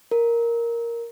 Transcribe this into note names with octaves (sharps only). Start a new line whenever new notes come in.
A#4